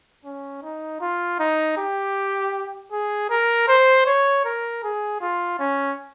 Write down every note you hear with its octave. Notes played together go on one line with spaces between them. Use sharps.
C#4
D#4
F4
D#4
G4
G#4
A#4
C5
C#5
A#4
G#4
F4
C#4